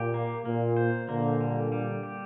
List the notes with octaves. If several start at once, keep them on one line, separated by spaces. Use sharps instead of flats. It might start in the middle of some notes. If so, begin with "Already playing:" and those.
Already playing: A#2 G4
A#3
A#2 A#3
C5
A#2 D3 A#3
G3
G3
G4